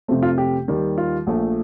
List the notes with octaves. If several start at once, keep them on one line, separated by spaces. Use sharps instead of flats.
F2 C3 F3 A3 C4
F4
G4
D#2 D#3 G3
F4
A#1 A#2 A3